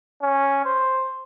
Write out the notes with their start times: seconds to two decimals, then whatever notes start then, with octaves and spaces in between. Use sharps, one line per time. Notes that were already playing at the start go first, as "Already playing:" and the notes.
0.22 C#4
0.66 C5